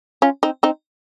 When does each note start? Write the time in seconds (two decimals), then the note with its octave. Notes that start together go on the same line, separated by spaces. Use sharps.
0.22 C#4 F4
0.43 C4 D#4
0.63 C4 D#4